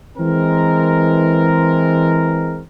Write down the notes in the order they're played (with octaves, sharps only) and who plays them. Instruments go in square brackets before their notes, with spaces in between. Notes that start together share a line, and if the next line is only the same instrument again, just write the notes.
[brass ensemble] E3 G#3 C4 A#4